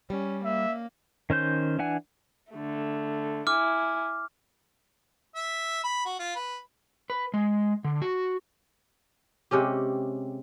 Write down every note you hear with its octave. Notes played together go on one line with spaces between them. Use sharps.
G3 C#4
A#3 E5
D#3 C#4 C5 G6
E3 D4 F#5 G#5
D3 A3
E4 G#5 D6 F6
E5
B5
F#4
F4
B4
B4
G#3
D3
F#4
C3 G#3 C#4 G4